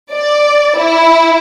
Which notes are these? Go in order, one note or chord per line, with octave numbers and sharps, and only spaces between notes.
D5
E4